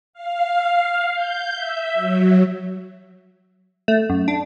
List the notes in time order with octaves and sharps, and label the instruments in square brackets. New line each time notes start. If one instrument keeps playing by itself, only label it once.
[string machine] F5
G6
E5
F#3
[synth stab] A3
F#2
D4